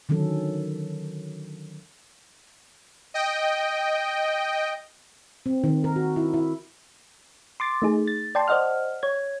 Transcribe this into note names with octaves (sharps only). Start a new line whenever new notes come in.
D3 D#3 F#3 C#4 A4
D#5 G5
C4
D#3
A#4
F#4
E4
E4
C6 D6 A6
A3 D#4 G#4
A6
D5 G5 A5 C6
C5 D5 D#5 F#5 F6
C#5 G#6